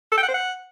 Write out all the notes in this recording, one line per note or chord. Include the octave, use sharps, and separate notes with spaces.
A4
G5
F#5
C5
F#5